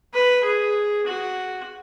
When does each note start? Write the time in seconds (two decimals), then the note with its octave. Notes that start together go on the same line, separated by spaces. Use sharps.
0.14 B4
0.44 G#4
1.07 F#4